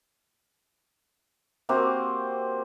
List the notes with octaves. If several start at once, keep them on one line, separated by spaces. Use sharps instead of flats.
A#3 C4 F#4 G4